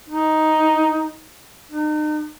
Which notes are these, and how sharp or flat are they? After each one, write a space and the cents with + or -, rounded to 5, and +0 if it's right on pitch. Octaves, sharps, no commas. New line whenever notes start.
D#4 +5
D#4 -40